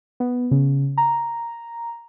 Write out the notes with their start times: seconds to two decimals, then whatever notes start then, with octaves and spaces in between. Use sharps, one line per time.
0.20 B3
0.51 C#3
0.98 A#5